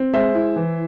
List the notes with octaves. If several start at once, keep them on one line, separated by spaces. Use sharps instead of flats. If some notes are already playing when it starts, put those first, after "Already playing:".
Already playing: C4
G#3 C5 E5
E4
E3